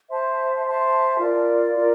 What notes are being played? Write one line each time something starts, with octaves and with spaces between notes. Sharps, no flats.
C5 E5 A5 C6
C5 E5 A5 C6
F4 A#4 D5
F4 A#4 D5